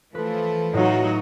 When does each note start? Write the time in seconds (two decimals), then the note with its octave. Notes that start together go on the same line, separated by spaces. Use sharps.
0.15 E3 F3 A3 A4 B4
0.73 A2 F#3 D#4 F4 F#4